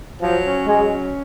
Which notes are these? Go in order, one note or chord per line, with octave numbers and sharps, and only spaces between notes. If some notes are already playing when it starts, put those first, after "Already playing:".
F3 F#3
C#4
F#3 G#3
C#4